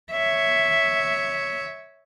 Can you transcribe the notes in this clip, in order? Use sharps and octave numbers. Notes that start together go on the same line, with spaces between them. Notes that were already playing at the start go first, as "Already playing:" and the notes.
C#5 E5